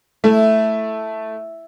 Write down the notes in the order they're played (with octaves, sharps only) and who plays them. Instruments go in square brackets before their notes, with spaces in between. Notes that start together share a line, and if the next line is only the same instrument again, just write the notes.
[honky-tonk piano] A3 [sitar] E4